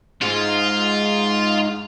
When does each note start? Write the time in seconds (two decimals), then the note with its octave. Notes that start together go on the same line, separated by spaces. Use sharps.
0.21 G#2 F4